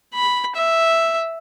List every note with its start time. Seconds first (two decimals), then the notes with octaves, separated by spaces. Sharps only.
0.14 B5
0.55 E5